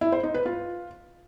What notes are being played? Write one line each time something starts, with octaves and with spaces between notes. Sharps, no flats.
E4
C5
D#4
B4
F4